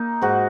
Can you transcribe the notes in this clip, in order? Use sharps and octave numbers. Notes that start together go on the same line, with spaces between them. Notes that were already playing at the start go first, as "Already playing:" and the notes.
Already playing: A#3 D#4
G#2 F#4